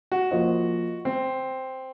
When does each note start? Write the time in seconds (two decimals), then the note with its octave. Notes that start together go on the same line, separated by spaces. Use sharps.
0.12 F#4
0.31 F3 A#3 F4 C5 D#5
1.05 C4